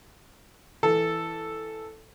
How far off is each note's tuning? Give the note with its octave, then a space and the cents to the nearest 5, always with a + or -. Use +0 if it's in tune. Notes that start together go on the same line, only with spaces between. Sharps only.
E3 +0 A4 +0